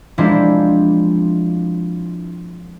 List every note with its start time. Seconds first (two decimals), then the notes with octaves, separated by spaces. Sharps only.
0.18 F3 G#3 A#3 C4 D4 E4